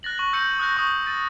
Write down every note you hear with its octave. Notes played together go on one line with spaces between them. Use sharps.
F#6 A6 A#6 F#7
C#6 F#6 A6 F#7
E6 G6 A#6 C#7 D#7 F#7
D#6 E6 F#6 G6 A#6
C#6 D#6 G6
A6 D#7